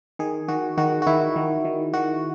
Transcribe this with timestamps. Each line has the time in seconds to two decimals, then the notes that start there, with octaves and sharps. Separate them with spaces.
0.19 D#3 G#4
0.48 D#3 F#4
0.78 D#3 F#4
1.02 F#4
1.07 D#3 E4
1.36 D#3
1.65 D#3
1.94 D#3 F#4